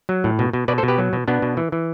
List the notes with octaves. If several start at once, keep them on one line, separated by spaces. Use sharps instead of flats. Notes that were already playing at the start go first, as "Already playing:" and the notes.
F#3
A2
B2
B2
B2 B4 D5
A4 C5
B2
G4 B4
F#3
B2
B2 B3 D4
B2
E3
E3